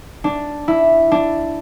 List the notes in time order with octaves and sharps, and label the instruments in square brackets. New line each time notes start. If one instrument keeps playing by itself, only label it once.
[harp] D4
E4
D4